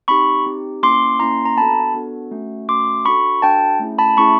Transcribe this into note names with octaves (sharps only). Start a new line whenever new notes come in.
C4 D#4 G4 B5 C#6
C4 D#4 G4
A#3 C#4 E4 C6 D6
A#3 C#4 E4 A#5 C6
A#5
B3 D4 F#4 A4 A5 B5
B3 D4 F#4 A4
A3 C#4 F#4
A3 C#4 F#4 C6 D6
D4 F#4 A4 B5 C#6
D4 F#4 A4 G5 A5
A3 C#4 E4 G#4
A5 B5
A3 C#4 E4 G#4 B5 C#6